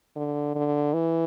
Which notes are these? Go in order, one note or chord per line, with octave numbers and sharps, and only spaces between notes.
D3
D3
E3